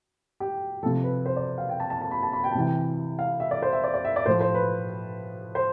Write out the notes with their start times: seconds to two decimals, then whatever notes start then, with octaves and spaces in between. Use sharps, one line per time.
0.40 G4
0.83 F3 A4
0.86 C3
1.04 B4
1.26 C5
1.36 D5
1.58 F5
1.69 G5
1.80 A5
1.90 A5
2.01 A5
2.11 B5
2.23 A5
2.33 B5
2.44 G5
2.51 A5
2.55 C3 E3 G5
3.19 F5
3.40 E5
3.51 D5
3.62 C5
3.73 E5
3.84 D5
3.94 D5
4.05 E5
4.16 D5
4.26 A2 F3 C5
4.41 C5
4.54 B4
5.55 C5